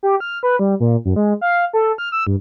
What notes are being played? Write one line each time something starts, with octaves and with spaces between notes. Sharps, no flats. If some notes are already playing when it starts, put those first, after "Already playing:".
G4
F6
B4
G3
A#2
F#2
G#3
F5
A4
F6
E6
G2